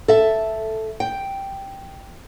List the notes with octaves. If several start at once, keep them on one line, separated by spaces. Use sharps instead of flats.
A4 E5
G5